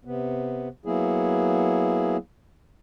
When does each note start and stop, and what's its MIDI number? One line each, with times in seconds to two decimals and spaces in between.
0.05 0.69 48
0.05 0.69 59
0.86 2.17 54
0.86 2.17 58
0.86 2.17 59
0.86 2.17 64
0.86 2.17 68